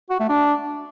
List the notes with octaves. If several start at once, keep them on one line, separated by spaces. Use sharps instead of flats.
F#4
A3
D4